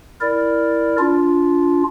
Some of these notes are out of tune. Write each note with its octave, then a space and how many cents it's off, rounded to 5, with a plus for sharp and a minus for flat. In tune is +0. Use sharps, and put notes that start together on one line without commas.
E4 +0 A#4 +0 D5 +0
D4 -30 F4 +0